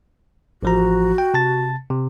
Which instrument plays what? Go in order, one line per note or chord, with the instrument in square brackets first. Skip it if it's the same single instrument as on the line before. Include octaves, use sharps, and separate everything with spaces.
[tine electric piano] A1 F3 A#5 [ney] F#4
[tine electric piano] G5
C3 A5 A6
C3